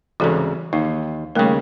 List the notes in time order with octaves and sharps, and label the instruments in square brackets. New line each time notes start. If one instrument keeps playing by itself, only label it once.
[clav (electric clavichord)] C2 G#2 C#3 [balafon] E3 F#4 A4
[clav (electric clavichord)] D#2 [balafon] D#4
[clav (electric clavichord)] D#2 C#3 [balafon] G3 A3 A#4